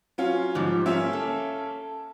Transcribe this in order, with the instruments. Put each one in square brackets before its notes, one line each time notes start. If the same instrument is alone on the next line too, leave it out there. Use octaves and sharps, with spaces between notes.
[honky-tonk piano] F#3 C#4 F4
[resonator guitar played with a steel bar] G#2 F3 G3
[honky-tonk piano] A#3 C#4 E5
[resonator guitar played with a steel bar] A4